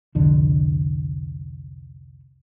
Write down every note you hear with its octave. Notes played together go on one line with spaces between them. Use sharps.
C2 F2 D3